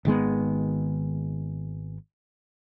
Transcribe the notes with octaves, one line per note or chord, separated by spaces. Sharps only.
G#1 D#3 G#3 B3